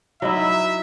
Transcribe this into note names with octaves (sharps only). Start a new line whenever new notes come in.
F#3 D#4 E4 E5